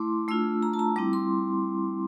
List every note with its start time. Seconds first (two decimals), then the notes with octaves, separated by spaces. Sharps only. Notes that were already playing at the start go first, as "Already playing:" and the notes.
Already playing: A3 E4 C6 D6
0.28 A3 D4 F4 E6
0.63 A#5
0.73 A5
0.79 A#5
0.96 G3 C4 E4 D6
1.13 C6